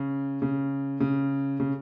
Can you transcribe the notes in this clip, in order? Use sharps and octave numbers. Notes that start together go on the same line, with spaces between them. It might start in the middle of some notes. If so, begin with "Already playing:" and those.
Already playing: C#3
C#3
C#3
C#3